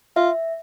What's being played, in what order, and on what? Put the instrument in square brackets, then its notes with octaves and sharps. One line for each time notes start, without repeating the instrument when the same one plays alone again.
[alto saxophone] F4 [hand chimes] E5